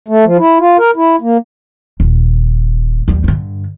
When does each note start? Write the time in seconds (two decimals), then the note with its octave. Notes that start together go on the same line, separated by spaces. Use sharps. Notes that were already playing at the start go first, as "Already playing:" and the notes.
0.08 A3
0.25 F3
0.39 E4
0.59 F4
0.78 A#4
0.96 E4
1.21 A#3
2.00 D#1
3.08 D#2 G3
3.24 G2 D3